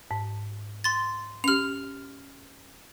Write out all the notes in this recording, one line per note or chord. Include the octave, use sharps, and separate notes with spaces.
G#2
C6 A6
C#4 G4 F6 F7